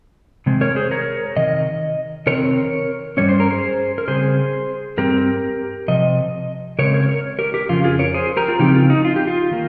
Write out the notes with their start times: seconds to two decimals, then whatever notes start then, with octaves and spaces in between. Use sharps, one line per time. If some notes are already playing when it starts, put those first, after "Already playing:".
0.46 C3 D#3 G#3 C4
0.61 A#4 C#5
0.76 G#4 C5
0.91 A#4 C#5
1.36 C3 D#3 D#5
2.26 C3 D#3 C4 A#4 C#5
3.17 G2 G3 C#4 C#5
3.29 C5
3.40 A#4
3.51 G#4 C5
3.98 A#4
4.08 C#3 G3 C4 G#4 C5
4.98 G2 G3 C4 G4 A#4
5.88 C3 F3 D#5
6.79 C#3 G#3 C4 A#4 C#5
6.94 A#4 C#5
7.09 A#4 C#5
7.39 G4 A#4
7.54 G4 A#4
7.69 F2 C#3 F3 F4
7.84 F4 G#4
7.99 A#4 C#5
8.14 G#4 C5
8.37 G4 A#4
8.48 F4
8.59 C#3 F3 C4 D#4 G4
8.75 F4
8.90 D#4
9.05 F4
9.16 G4
9.27 F4
9.51 D#3 A#3